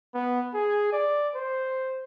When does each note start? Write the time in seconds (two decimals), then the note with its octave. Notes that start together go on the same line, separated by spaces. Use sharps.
0.14 B3
0.55 G#4
0.93 D5
1.35 C5